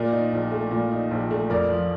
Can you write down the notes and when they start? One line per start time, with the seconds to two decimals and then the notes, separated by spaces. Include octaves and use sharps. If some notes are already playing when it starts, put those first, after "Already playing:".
Already playing: A#2 A#4 D5
0.12 D#4
0.33 A#1
0.52 A3
0.71 A#2
0.92 D#4
1.11 A#1
1.31 A3
1.50 F2 A#4 D5
1.70 F3